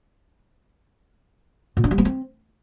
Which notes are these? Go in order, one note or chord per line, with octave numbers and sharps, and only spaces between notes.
A#2
D4
G3
B3
C4